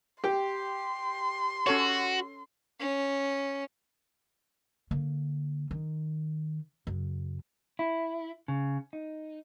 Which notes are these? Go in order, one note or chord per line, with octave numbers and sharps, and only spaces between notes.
G4 G5 C6
C#4 F#4 A4 C#5
C#4
D3 A#3
D#3
F#2 C#3
E4
C#3
D#4